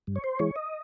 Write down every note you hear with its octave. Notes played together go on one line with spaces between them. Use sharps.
G2
C#5
C5
E3 G#3 C#5
D#5